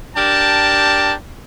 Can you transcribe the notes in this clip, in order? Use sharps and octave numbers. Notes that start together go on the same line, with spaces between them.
D4 G4 A#4 G5 A5